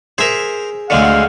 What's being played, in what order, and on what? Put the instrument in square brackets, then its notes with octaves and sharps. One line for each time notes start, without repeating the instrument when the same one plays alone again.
[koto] G#4 E5 [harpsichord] A#4 C5
[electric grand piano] D2 C#7 [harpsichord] D3 F#3 G#3 [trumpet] F5